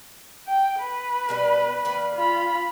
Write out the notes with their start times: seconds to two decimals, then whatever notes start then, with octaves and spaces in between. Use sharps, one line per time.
0.47 G5
0.80 B4
1.29 B2 G3 D5
1.85 D#3 A#3 D5
2.15 F4 B5